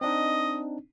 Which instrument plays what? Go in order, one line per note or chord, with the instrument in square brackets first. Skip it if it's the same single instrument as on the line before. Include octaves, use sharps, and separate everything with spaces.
[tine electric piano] C4 D4 D#4 [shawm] D#5